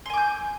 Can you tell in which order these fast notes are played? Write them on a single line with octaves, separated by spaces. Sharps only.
C6 G#5 D6 G6